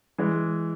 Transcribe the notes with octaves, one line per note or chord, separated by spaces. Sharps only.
E3 G#3